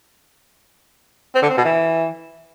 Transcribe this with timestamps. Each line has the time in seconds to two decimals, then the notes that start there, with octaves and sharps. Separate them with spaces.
1.35 C4
1.42 D3
1.50 C4
1.57 B2
1.65 E3